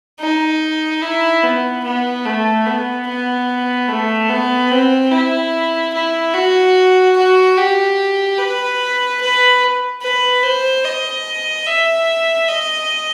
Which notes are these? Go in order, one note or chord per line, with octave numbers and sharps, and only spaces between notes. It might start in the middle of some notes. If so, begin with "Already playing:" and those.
D#4
E4
B3
B3
A3
B3
B3
A3
B3
C4
E4
E4
F#4
F#4
G4
B4
B4
B4
C5
D#5
E5
D#5